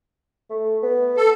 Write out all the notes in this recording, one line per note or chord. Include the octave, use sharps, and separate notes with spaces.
A3
B3
A4